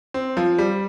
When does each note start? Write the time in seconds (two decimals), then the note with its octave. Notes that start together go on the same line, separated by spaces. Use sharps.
0.14 C4
0.37 F3
0.58 G3